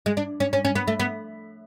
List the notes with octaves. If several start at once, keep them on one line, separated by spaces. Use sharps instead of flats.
G#3
D4
C#4
C#4
C#4
B3
A3
B3